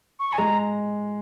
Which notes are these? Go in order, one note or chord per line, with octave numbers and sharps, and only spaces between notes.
C#6
G#5
G#3 A#5